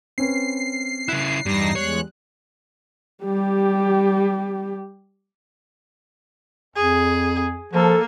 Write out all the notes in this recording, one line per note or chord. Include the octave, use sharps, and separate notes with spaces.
C4 C#4 B4 C7
C#3 E4 F#6
E2 G2 G3 D#4 A#6
E2 G#3 C#5 F#6
G3 G4
F2 G#4
F3 A#3 A4